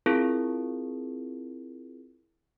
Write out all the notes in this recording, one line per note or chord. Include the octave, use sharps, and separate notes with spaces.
C4 E4 F4 G#4 A#4